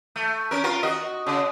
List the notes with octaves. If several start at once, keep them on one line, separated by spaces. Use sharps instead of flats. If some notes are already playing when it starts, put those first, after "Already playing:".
A3
C#4 A#4
F4 A#4
F#4 D#5
C#3